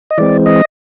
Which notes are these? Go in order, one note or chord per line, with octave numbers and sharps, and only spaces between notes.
D#5
E3 G#3 C4 D5
D#5